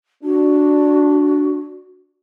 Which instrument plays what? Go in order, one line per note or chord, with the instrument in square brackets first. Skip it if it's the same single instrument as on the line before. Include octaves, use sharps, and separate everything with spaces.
[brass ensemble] D4 [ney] F#4